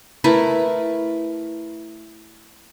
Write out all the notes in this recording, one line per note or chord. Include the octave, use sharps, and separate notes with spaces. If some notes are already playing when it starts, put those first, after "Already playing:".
A3 E4 A#4 B4